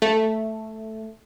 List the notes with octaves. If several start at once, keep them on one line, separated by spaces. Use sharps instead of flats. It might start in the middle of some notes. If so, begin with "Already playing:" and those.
A3